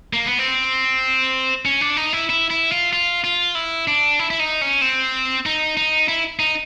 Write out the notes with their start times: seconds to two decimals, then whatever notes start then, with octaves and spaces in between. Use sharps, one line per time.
0.13 A#3
0.26 B3
0.39 C4
1.65 C#4
1.81 D4
1.97 D#4
2.13 E4
2.29 E4
2.50 E4
2.72 F4
2.93 F4
3.24 F4
3.55 E4
3.88 D4
4.19 E4
4.30 E4
4.39 D#4
4.61 C#4
4.81 C4
5.46 D#4
5.77 D#4
6.08 E4
6.39 D#4